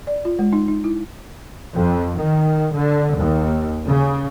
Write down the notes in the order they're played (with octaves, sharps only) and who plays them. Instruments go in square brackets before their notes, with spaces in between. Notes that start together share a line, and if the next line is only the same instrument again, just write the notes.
[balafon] D5
F4
G#3
D#4
D#4
E4
[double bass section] F2
D#3
D3
D#2
C#3